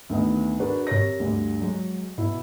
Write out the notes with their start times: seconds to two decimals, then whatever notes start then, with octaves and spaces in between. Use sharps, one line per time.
0.09 D2 D#3 B3 D#5
0.60 D4 F#4 G#4 A#4 B4
0.87 C3 A#4 C#5 A#6
1.20 D2 G2 D3
1.61 F#3 G#3
2.18 B2 E4